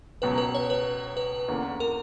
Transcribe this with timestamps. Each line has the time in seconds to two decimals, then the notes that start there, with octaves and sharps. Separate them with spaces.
0.22 C#2 B2 F#3 C#4 B4
0.38 B4
0.54 C#5
0.70 B4
1.17 B4
1.48 E2 D3 A#3 C#4
1.80 A#4